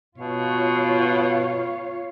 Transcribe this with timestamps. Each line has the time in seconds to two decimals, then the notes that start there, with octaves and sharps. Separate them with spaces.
0.18 B2 F4 C#5 F5